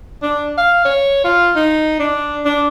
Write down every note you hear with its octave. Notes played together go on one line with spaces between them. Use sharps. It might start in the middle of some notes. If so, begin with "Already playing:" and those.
D4
F5
C#5
F4
D#4
D4
D4